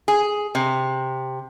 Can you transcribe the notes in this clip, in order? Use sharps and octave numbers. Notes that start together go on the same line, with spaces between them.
G#4
C3